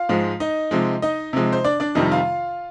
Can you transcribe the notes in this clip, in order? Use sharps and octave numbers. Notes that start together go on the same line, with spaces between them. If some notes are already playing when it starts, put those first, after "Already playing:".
Already playing: F4 F5
G#2 F3 G#3
D#4 D#5
C3 F3 G#3
D#4 D#5
C3 F3 G#3
C5
D4 D5
D4 D5
F2 C3 D#3 G3 D#4 D#5
F4 F5